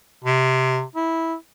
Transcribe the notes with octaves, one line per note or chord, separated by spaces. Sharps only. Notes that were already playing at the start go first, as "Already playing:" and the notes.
C3
E4